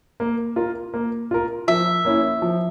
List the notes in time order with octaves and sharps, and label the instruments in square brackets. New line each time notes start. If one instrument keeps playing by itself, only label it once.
[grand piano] A#3
F4 A#4
A#3
F4 A#4
[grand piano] F3 [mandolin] E5
[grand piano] A#3 C#4 E4
F3